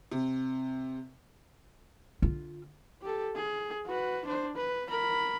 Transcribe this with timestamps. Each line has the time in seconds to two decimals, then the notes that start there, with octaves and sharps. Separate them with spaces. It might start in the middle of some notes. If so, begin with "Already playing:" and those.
0.12 C3
2.22 D3 F4
3.02 G4 A4
3.35 G#4
3.86 F#4 B4
4.26 D4 C5
4.56 B4
4.89 A#4 B5